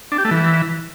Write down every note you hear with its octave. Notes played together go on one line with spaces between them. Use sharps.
D4
G4
A3
E3